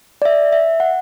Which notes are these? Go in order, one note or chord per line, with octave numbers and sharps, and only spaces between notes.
D5
E5
E5
F#5